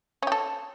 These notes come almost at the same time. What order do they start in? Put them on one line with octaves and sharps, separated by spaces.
C#4 G4 A4